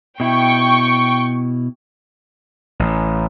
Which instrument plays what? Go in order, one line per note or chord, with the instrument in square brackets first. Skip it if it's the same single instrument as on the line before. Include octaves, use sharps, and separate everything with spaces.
[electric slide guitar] B2 E4 [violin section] G5 C#6
[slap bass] A1